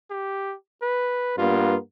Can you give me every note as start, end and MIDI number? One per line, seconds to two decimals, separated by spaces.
0.11 0.55 67
0.82 1.33 71
1.38 1.76 43
1.38 1.76 58
1.38 1.76 59
1.38 1.75 65